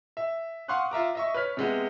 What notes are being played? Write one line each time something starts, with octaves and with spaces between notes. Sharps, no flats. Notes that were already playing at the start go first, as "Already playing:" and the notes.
E5
F5 F#5 C6 C#6 D#6 F#6
F4 E5 A#5 D6
D#5 E5 C#6
B4 C#5 F6 B6
C3 G#3 B3